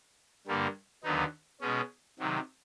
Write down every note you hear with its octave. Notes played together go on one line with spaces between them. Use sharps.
G2 D3 G3 A#3
D#2 D3 F#3 B3 D#4
B2 G#3 C#4
C3 D#3 F#3